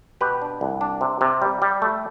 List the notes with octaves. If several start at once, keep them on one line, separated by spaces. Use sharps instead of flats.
B2 G4 B4
D4
C2
D4
C3
C3
G3
G3
A3